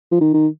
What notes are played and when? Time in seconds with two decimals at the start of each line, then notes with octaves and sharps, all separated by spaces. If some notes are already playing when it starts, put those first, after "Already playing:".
0.12 F3
0.21 D#3
0.33 D#3